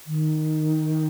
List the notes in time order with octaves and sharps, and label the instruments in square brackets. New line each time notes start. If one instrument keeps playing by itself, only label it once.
[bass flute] D#3